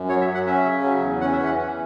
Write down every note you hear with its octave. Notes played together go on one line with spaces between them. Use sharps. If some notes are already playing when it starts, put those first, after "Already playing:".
Already playing: F#2
F#3 C#5
E5
F#3
F#5
C#4 E5
C#3
F#3
E2
C#4 F#5
E5
E3
F#5
E3